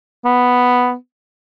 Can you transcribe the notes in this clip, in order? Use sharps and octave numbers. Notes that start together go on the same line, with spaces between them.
B3